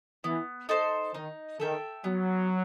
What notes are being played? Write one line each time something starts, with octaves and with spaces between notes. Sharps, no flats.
E3 B3
D#4 A4 C5
D#3 D#4
D#3 A4 E5 G5
F#3 B3